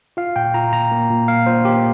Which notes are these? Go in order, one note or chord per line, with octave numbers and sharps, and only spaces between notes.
F4 F5
A#2 G5
F4 A#5
A#2 A#5
A#3
A#2
A#3 F5
A#2 C5
A#3 G4